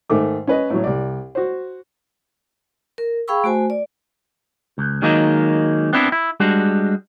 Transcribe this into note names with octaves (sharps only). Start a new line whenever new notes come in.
G#2 D#3 A3 D6
C#4 B4 D#5
A2 F#3
C2 D5
F#4 C5
A#4
G#4 F5 G5 B5 C#6 E6
A3 F#4 C5 G#5
D5
C#2
D#3 F#3 G#3 A#3 D#4
B3 C4 D4 E4
E4
G3 G#3 D4 F#4